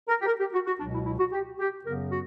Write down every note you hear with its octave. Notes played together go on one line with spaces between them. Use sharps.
A#4
G4
A#4
G4
F#4
F#4
C#2 B2 F#3 D4
E4
E4
F#4
G4
G4
F#2 C#3 F#3 B3 A#4
F#4